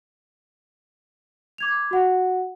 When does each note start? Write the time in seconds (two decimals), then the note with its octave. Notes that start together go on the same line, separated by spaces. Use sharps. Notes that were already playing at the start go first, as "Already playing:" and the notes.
1.58 D6 G#6 F7
1.91 F#4 F#5